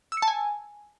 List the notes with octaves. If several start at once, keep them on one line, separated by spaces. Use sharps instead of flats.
E6
C#7
A5
G#5